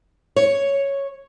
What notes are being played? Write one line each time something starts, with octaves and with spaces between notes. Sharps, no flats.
C#5